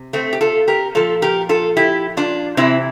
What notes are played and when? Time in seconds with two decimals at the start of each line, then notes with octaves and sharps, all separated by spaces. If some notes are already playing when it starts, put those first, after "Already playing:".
Already playing: C3
0.13 A3 C4
0.33 G4
0.41 F4 A4
0.68 G4 A#4
0.95 A#2 F3 F4 A4
1.22 G4 A#4
1.49 F4 A4
1.77 E4 G4
2.17 D4 F4
2.57 C3 E3 C4 E4